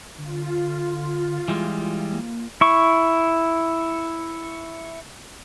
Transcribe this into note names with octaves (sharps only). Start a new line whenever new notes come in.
D3 F4
E3 G3 G#3
A#3
E4 C#6